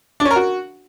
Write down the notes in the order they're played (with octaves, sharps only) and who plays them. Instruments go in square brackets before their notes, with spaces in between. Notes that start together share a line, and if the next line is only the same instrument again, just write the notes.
[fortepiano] D4
C#4
A#4
F#4